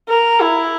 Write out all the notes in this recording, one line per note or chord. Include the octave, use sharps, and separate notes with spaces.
A#4
E4